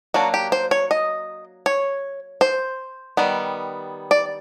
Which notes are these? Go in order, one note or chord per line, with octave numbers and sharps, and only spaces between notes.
F#3 A#3 D4 F#4
G4
C5
C#5
D#5
C#5
C5
D#3 G3 B3
D5